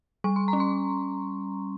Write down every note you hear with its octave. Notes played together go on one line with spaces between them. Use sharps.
G3 C#6
C6
A#5
C#4
C6